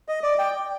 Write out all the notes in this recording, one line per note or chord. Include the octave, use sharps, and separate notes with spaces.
D#5
D5
G5